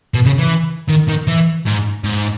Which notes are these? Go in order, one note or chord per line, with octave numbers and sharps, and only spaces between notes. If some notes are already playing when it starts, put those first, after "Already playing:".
B2
C#3
E3
D#3
D#3
E3
G#2
G#2